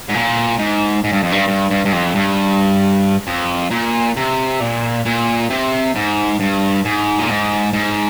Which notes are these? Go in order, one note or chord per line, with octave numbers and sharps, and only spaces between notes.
G#2
A#2
G#2
G#2
G2
F2
G2
G2
G2
G2
F2
G2
F2
A#2
C3
A#2
A#2
C3
G#2
G2
G#2
A#2
G#2
G#2